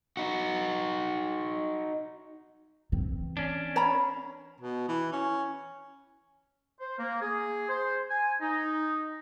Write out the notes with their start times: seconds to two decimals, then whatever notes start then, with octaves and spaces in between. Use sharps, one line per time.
0.17 D#4 F#4
2.92 E3 C4
3.37 C#4 D4
3.76 C#5 A#5 B5
4.60 B2
4.88 E3
5.12 C#4
6.80 C5
6.99 A#3
7.21 G#4
7.68 C5
8.10 G#5
8.42 D#4